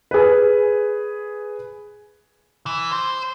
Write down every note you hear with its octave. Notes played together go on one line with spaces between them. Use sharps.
G#4 B4
E3
C5